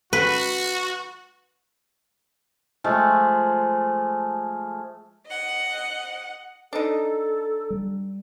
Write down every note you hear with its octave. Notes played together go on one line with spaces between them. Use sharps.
F#4 B4
F3 G#3 A3 F4
D#5 F#5
D4 D#4 A4
G3